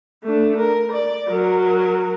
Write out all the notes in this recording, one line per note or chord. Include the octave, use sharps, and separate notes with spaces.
A3 D4
A#4
D5
F#3 A#4